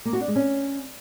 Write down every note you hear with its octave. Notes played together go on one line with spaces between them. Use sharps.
A#3
F#4
D4
G#3
C#4